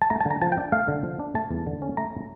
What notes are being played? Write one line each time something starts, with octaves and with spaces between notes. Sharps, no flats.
A5
A3 A#5
A5
D3
A#5
F3 A5
G5
D4
A3 F5
D3
F3
D4
A3 A5
E2
D3
C#4
A3 A#5